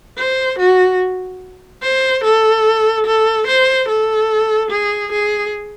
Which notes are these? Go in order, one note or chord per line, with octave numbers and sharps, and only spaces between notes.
C5
F#4
C5
A4
A4
C5
A4
G#4
G#4